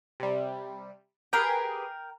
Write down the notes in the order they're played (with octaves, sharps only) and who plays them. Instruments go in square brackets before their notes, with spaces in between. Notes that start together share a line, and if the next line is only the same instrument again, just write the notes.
[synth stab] C3 G3
[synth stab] G4 G#4 B4 [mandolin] A#4 G5